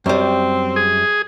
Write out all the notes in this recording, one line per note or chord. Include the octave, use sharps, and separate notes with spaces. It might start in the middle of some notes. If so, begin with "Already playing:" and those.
F#2 G3 C4
G#4